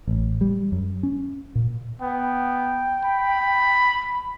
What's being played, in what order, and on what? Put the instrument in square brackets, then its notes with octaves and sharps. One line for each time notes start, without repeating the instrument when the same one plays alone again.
[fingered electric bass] A1
G3
F#2
C#4
A#2
[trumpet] B3 [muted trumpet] G5
[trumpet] B5